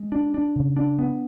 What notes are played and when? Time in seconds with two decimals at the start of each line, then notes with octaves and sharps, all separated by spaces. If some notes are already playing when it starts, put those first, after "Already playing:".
Already playing: G#3
0.12 D4
0.34 D4
0.56 C#3
0.76 D4
0.99 B3